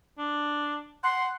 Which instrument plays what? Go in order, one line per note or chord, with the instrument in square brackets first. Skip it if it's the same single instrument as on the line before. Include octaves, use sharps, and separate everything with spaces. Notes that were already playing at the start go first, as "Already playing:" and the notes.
[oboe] D4
[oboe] F#5 [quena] C6